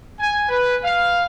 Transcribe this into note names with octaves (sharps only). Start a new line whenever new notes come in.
G#5
B4
F5